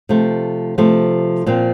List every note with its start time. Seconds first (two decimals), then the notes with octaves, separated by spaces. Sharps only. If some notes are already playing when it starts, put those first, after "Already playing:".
0.09 C3 F3 A3
0.78 C3 F3 A3
1.46 A#2 F3 C4